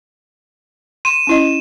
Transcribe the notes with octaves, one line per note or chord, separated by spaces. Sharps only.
C6 D#7 E7
C#4 E4 D#5